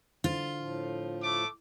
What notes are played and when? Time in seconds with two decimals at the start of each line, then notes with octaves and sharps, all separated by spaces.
0.24 D3 F4 C5 A6
0.58 A2 F3
1.23 A3 D6